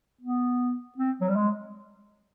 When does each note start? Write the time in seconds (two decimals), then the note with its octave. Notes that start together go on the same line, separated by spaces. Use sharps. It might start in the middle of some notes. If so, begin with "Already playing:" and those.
0.21 B3
0.98 C4
1.21 F#3
1.29 G3
1.35 G#3